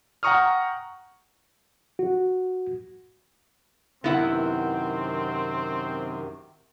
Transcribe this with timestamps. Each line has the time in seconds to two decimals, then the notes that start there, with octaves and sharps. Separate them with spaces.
0.23 F#5 G5 A#5 C#6 D#6 F6
1.99 F#4
4.04 F#2 C3 D#3 B3 C4 E4 F#5